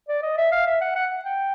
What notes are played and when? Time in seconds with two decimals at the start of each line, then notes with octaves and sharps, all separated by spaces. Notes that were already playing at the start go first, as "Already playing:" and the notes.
0.08 D5
0.22 D#5
0.37 E5
0.52 F5
0.66 E5
0.81 F#5
0.95 F#5
1.25 G5